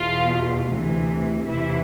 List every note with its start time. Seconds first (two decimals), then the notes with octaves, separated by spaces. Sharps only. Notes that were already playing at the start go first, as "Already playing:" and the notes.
Already playing: E2 B2 F4
0.69 D2 C3 E3
1.47 E2 C3 E3 E4